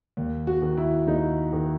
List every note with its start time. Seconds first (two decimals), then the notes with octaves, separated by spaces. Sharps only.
0.17 D#2
0.47 F#4
0.62 D#3
0.77 E4
1.07 D#2 D#4
1.53 D#3